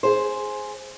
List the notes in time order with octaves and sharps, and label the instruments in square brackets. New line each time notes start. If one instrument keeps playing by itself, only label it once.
[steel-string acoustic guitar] G#4 C5